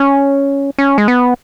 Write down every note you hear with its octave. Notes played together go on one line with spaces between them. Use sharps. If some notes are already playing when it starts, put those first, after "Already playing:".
Already playing: C#4
C#4
G#3
B3